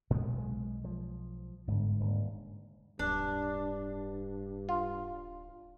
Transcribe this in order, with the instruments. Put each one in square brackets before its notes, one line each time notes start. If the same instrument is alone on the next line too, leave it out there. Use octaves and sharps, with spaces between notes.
[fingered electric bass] B1 [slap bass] A2 G#3 B3
[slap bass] G#3
F3
[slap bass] G1 [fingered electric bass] G#2 D3
[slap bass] D#1
[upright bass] D1 [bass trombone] G2 [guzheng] D4
[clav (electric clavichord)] F4